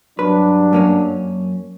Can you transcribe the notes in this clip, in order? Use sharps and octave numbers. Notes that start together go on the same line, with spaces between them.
G2 F#3 D4 B4
F#2 A#3 C#4